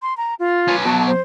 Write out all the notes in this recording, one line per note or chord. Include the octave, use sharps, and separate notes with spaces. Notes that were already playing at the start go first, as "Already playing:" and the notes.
C6
A#5
F4
C#4 B4
B2 F#3 A5
C5